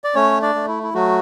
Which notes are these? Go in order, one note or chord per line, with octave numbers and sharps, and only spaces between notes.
D5
A3 C#4 C#5
D4 D5
A3
E4
E4
F#3 A3 F#4